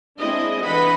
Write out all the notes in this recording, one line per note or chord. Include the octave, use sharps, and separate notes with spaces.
G#3 C4 D4 E4 D#5
D3 E3 B4 D#5 F#5 B5